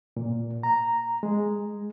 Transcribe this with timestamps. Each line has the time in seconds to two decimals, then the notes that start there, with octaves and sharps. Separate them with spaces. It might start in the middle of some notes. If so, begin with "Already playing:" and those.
0.17 A#2
0.63 A#5
1.23 G#3